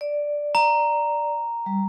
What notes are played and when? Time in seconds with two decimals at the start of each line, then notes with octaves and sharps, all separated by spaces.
0.01 D5
0.55 A#5
1.66 G3